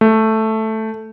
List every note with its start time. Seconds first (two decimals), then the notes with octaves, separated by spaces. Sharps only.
0.01 A3